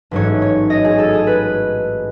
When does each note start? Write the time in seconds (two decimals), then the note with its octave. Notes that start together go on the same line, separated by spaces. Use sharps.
0.11 A1 G#2 F#3 A3 C#4 C#5
0.42 C#5
0.70 D#5
0.85 G#4
0.98 A4
1.13 G#4
1.27 B4